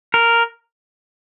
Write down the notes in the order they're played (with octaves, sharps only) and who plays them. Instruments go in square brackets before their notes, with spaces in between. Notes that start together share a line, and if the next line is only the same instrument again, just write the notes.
[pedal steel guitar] A#4